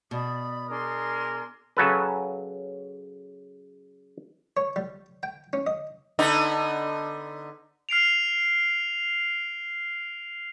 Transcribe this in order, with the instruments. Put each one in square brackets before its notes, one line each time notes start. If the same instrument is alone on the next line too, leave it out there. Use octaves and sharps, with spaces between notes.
[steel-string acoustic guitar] B2 [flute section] D5 B5 [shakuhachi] D#6
[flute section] D4 G#4 C6 [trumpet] A#4
[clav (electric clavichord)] C#3 F#3 A4 B4
[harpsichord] C#5
G3
G5
C#4
D#5
[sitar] D3 B3 D#4
[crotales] F6 C7 D7 F7